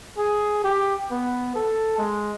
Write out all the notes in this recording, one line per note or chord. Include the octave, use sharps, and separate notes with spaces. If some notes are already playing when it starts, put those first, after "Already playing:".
G#4
G4
B3
A4
G#3